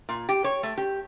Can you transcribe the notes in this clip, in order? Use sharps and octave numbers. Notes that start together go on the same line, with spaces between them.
A#2
G4
C#5
A3
G4